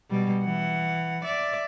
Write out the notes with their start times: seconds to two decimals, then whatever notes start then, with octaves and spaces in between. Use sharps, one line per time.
0.10 B2 G3
0.44 E3 F#5
1.25 D5 E5